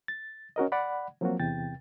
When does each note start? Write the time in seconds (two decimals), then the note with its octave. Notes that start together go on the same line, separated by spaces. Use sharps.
0.08 A6
0.56 C#4 F#4 A#4 D#5
0.72 D5 F#5 B5
1.21 F3 F#3 A#3 C4 F4 F#4
1.40 E2 C3 G5 A6